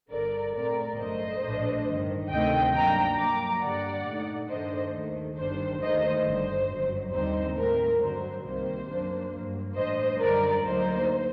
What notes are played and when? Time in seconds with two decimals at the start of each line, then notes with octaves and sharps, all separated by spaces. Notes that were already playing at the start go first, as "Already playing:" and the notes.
0.10 G1 G2 D3 A#4 D5
0.54 A#2 A3 C4 A#4 D5
0.98 G1 F#2 D3 A3 C5 D#5
1.42 A#1 A2 A3 D4
1.86 G1 G2 D#3
2.29 D2 C3 D#3 A3 C4 D#5 G5
2.74 G2 F#3 A#3 D4 G5 A#5
3.17 G2 F#3 A#3 A#5 D6
3.62 G2 D3 G3 D5 F#5
4.05 A#2 A3 D#4
4.49 G2 D#3 A3 D4 C5 D#5
4.93 D#2 D#3 A3
5.37 G1 G2 D#3 G3 D4 C5
5.81 D#2 D#3 A3 D#4 C5 D#5
6.24 G1 G2 D3 C5
6.69 G1 F#2 F#3
7.13 D#2 D3 G3 C4 D#4 C5
7.56 A2 A3 C4 A#4
8.01 G2 D3 F#3 C5
8.44 C2 C3 D#3 G3 A#3 C5
8.88 F#2 F#3 A#3 D4
9.32 G2 F#3 A#3
9.76 A1 A2 G3 D4 C5 D#5
10.19 F#2 D3 G3 A#4 D5
10.63 D2 D3 F#3 A#3 D#4 C5